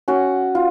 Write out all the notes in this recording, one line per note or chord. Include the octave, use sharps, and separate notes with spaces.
C#4 F#4
F4